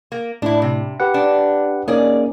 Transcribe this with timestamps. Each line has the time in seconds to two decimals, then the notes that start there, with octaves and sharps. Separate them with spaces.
0.12 A#3
0.42 A2 D4 E4
0.62 C3
1.00 G4 B4 F#5
1.14 D4
1.88 A#3 C#4 D#4 G#4 D5